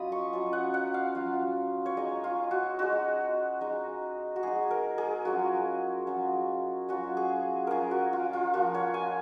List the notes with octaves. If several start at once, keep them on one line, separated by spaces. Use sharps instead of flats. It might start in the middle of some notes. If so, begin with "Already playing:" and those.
Already playing: F#3 C#4 F4 D#5 B5 D#6
C#6
F#3 C#4 F4
F#5
F#5
F5
F#3 C#4 F4
C#5
G#3 D#4 D#5
F4
F#4
G#3 D#4 F#4
G#3 D#4
F#4
G#3 D#4 G#4
A#4
G#4
F#3 C#4 F4 F#4
F#3 C#4 F4
F#3 C#4 F4 F#4
G#4
F#3 C#4 F4 G#4 A#4
F#4
F4
F4
F3 A#3 F4 F#4
C#5
G#5